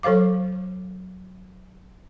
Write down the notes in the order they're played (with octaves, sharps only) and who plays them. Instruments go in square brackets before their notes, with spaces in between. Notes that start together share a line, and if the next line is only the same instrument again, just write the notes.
[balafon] F#3 A4 C5 F5 D6